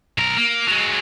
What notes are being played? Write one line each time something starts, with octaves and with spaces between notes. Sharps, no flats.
B1 A#4
A#3
F#3 G#3